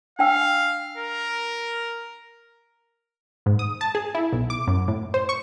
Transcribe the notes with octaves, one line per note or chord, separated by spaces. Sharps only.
D4 F5 G5 E6
A#4
G#2
D#6
A5
G#4
E4
B1
D6
F#2
A2
C5
C#6